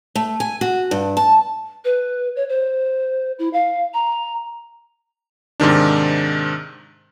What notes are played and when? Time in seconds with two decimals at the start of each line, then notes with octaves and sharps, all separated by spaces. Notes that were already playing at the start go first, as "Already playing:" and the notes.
0.16 A3
0.40 G#5
0.61 F#4
0.91 G2
1.17 A5
1.85 B4
2.36 C#5
2.49 C5
3.39 E4
3.53 F5
3.94 A#5
5.60 G#2 C3 D#3 D4